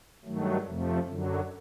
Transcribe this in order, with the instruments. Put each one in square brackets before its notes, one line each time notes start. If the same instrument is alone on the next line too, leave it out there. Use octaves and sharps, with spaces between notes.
[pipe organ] G2 D#3 F#3 A3
F2 C3 F3 A3
F#2 D3 F#3